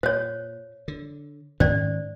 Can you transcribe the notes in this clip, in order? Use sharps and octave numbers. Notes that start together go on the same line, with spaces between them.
A#2 C5 C#5
D3
G#2 D#3 C#4 C5 D5